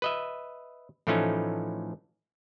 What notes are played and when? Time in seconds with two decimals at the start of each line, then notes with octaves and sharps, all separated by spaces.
0.02 B4 D#5 E5
1.07 A2 E3 F3 A3 C#4 D#4